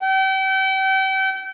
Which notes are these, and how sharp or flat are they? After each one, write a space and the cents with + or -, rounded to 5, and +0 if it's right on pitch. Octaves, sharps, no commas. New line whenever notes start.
G5 -35